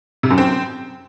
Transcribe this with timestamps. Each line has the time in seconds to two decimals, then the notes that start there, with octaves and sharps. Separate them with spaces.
0.23 C3
0.31 F#2
0.38 C4